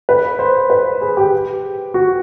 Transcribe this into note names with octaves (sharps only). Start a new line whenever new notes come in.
B4
C5
B4
G#4
G4
F#4